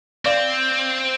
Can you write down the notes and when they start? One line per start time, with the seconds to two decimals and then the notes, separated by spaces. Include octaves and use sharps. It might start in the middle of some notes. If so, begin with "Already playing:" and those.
0.25 C4 D5 F5